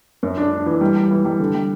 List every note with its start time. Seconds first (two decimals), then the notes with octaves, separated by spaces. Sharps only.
0.23 F#2
0.38 D4
0.52 D4
0.66 E3
0.81 G3
0.96 G3
1.11 E3
1.25 G3
1.40 D3
1.55 G3